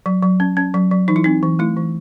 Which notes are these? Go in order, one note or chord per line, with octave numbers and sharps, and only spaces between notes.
F#3
F#3
C#4
C#4
F#3
F#3
E3 D#4
E4
C4 D#4
E3
A3 E4
E3